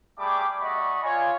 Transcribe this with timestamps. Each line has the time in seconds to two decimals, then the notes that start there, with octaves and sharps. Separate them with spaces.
0.19 G3 A3 G#4 B5 D6
0.60 A3 F#4 D5 D#5 B5 C#6
1.03 F4 C#5 G#5